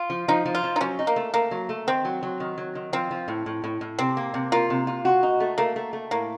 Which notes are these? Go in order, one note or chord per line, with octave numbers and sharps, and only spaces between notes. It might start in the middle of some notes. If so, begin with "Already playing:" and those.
Already playing: F4
F3
F3 D#4
F3
F4
F3
D#4
F#3 C#4
D#4
A#3
A3
A3 A#3
F#3
A3
D#3 C4
F#3
F#3
D#3
F#3
D#3
F3 C4
F3
A2
A2
A2
A2
C3 C4
A#3
C3
A#3 F4
C3
F4
F#4
D#4
A3
A3 A#3
A3
A3
A2 A#3